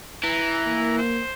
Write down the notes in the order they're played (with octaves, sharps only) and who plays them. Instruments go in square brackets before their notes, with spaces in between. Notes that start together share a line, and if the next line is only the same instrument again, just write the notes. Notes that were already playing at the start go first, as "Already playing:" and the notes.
[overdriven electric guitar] E3 [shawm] A#5
[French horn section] A#3
[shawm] C5